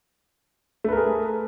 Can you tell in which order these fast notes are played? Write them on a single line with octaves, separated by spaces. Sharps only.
A3 B4 A#4 G#4